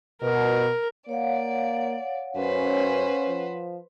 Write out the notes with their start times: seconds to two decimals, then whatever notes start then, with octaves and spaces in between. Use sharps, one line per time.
0.22 B2 A#4
1.09 A#3 C#5 D5 F5 F#5
2.36 F#2 C#4 B4 C5
3.28 F3